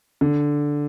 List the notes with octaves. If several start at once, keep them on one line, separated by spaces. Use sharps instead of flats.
D3